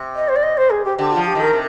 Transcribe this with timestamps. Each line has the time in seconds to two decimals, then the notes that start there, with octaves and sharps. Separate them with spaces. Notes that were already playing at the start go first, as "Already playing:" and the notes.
Already playing: C3
0.15 D#5
0.28 C5
0.35 D5
0.43 D#5
0.57 C5
0.70 G#4
0.84 G4
0.98 D3 G4
1.12 F3 F4
1.26 G4
1.35 D#3 A#4
1.53 C3